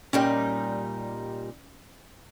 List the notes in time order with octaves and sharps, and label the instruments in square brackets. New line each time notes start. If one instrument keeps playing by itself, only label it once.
[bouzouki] A#2 G3 D#4 [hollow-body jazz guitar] C#4 G5